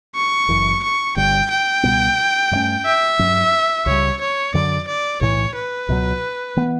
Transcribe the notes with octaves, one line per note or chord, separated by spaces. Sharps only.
C#6
F#1 F#2 E3
C#6
G1 G2 D3 G3 G5
G5
C#2 B2 G3 B3
G2 D3 A3 C#4
E5
G2 F#3 C#4
C#2 C#3 G3 C#5
C#5
F#2 D3 F#3 D5
D5
B1 A2 E3 C#5
B4
C#2 B2 F#3
E3 B3